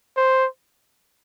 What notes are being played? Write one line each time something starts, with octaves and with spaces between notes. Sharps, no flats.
C5